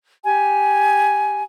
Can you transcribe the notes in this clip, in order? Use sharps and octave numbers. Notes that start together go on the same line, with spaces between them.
G4 G#5